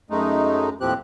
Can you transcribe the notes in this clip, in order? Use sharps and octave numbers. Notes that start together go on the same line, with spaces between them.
F#2 G#3 A3 D#4
D#2 A2 F3 C4 G4 F#6